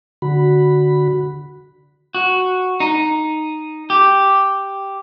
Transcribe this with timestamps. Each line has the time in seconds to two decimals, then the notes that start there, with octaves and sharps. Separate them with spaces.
0.22 D3 F#4 B5
2.15 F#4
2.80 D#4
3.90 G4